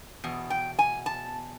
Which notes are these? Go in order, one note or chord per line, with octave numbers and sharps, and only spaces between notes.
E2 B2
G5
G#5
A5